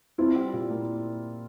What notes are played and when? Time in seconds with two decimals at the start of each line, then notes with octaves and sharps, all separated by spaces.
0.18 C4 E4 F4
0.35 G3
0.53 A#2
0.70 A#3